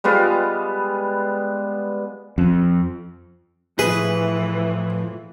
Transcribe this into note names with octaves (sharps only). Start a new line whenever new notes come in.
G3 G#3 B3 F4
F2
A2 E3 F3 G#4 B4